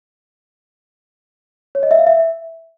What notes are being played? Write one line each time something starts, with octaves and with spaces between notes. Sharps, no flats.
C#5
D#5
E5
F5
E5